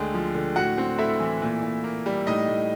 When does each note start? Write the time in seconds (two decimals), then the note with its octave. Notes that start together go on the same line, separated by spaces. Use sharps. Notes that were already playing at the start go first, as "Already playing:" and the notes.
Already playing: D2 D3 G#3 G5
0.14 F3
0.35 D3
0.56 A2 F#4 F#5
0.78 C4
0.98 A3 E4 E5
1.20 E3
1.42 A#2
1.63 A#2
1.84 A#3
2.06 G3
2.27 A2 D#4 D#5
2.48 A2